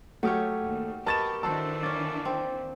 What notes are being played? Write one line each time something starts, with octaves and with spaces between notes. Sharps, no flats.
F#3 A3 G4 C#5 F#5 D#6 F6
D#2
B3 G4 A#4 D#5 A5 C#6 A6 E7
D#3 E3 D4 F#4 A4 C5 A5 E6
A#3 C#4 D6 A6
C4